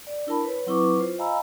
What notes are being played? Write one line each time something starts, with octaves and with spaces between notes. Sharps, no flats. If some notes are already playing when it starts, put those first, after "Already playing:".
D5
D4 E4 A#4 A5 B5
B4 C#5
F#3 C4 E4 B4 C#6 D6
F4 C5
D#5 F5 G#5 A#5 B5 E6